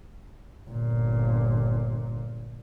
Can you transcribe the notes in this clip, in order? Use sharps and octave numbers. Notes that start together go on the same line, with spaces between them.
G1 A#2